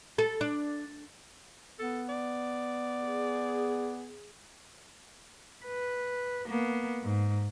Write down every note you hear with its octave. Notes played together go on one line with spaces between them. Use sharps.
A4
D4
B3 A4
D5
G#4
B4
A#3 B3
G#2